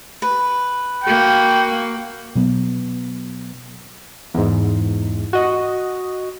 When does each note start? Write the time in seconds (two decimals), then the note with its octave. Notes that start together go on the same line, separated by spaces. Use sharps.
0.22 B4
1.04 A#3 F#4 G5
2.35 B2 F#3 B3
4.34 E2 G#2
5.33 F#4 D#5